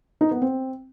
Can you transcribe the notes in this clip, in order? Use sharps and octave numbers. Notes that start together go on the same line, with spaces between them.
D#4
B3
C4